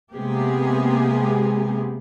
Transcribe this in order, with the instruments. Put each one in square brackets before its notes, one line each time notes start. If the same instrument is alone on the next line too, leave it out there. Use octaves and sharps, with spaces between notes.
[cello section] C3 G#3 A#3 B3 G4 G#4